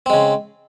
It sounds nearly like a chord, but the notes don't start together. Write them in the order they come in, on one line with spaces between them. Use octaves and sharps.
C4 G#3 C#3